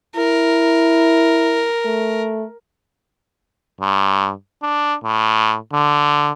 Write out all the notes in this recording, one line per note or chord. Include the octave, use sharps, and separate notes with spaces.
E4 A#4
A3
G2
D4
A2
D3